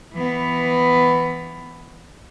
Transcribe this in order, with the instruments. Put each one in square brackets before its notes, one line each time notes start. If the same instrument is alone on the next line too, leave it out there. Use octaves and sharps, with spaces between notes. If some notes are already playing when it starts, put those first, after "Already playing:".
[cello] E3 B3